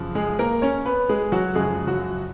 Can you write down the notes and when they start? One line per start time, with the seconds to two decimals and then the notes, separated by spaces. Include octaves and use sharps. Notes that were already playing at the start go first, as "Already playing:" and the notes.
Already playing: F#2 C#3 F3
0.15 G#3 G#4
0.39 A#3 A#4
0.62 C#4 C#5
0.85 B3 B4
1.09 G#3 G#4
1.32 F#3 F#4
1.55 F#2 C#3 F3 G#3 G#4
1.87 F#3 F#4